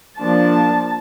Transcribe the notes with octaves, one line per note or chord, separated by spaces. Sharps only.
F3 A#3 D4 A5